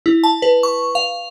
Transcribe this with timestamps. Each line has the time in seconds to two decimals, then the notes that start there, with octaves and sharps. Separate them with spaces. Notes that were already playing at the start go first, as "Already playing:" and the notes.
0.06 E4
0.24 A5
0.42 B4
0.63 C#6
0.95 F5